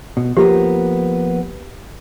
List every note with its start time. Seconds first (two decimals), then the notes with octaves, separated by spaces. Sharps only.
0.17 B2
0.37 F3 A#3 B3 G4